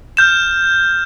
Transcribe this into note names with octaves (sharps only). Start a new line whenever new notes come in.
F6 G6 E7